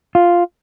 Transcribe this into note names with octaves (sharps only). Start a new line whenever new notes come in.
F4